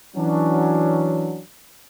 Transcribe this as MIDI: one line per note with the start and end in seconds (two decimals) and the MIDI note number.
0.16 1.40 52
0.16 1.40 54
0.16 1.40 61
0.16 1.40 62